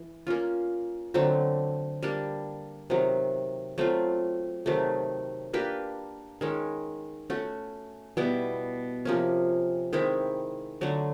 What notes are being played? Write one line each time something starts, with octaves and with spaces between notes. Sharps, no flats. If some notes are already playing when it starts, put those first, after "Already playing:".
Already playing: E3
A#3 C#4 F4
D3 F#3 A3 C4
G3 A#3 D4
C3 D#3 F#3
F#3 A3 C4 F4
C3 D#3 F#3 A3
A#3 D4 G4 B4
D#3 G#3 C#4
A3 C#4 F#4
B2 G3 B3 E4
C3 F3 A#3 C#4
D#3 G#3 C4 E4
D3 F#3 A3